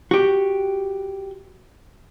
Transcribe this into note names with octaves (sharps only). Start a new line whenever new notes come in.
F#4 G4